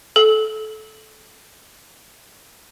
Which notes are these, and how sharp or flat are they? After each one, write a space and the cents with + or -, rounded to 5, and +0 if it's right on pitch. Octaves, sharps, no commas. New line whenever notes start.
A4 -20